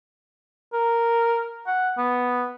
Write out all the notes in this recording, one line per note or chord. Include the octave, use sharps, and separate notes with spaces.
A#4
F#5
B3